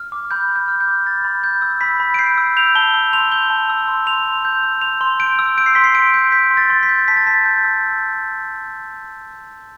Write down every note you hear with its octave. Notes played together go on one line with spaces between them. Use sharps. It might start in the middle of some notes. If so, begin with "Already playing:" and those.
Already playing: F6
D6
B5 G6
B5
G6
F6
G6
D6
B5 A6
B5
G6
E6
B5 B6
B5
D7
G6 C7
E6
G6 F7
A5 G7
E6
C6 F7
G6 G7
A5
E6
C6
C6 F7
C6
G6
E6
C6 F7
C6
G6 D7
E6
G6 D7
C7
C6 B6
C7
C6 D7
G6
G6 B6
C6
A6
C6
B6
G6
A5 B6
A6
A5 B6
G6
E6